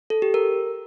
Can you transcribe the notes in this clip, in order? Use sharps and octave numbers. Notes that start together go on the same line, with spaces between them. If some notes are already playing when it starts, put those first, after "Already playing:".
A4
G4
A#4